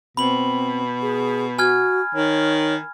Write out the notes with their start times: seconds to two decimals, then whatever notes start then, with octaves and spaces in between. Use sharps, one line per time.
0.17 B2 C4 B5 F#7
1.02 G#4
1.59 F#4 G#5 F6 G#6
2.15 D#3 C#5